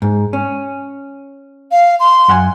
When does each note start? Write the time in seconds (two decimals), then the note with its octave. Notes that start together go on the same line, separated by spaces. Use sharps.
0.02 G#2
0.33 C#4
1.72 F5
2.00 C6
2.28 F#2 F#5 G#5